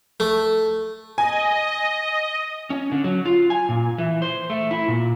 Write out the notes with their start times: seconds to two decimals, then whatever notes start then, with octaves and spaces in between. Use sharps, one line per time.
0.20 A3
1.18 D#5 G#5
2.70 C#4
2.92 D3
3.04 F#3
3.25 F4
3.50 G#5
3.69 A#2
3.98 E3
4.22 C5
4.50 A3
4.71 E4
4.88 A#2